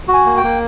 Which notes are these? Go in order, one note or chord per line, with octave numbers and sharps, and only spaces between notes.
F#4
G#5
A#3
G5
A#3